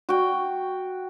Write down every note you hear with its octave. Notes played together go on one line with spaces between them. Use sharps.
F#4 G5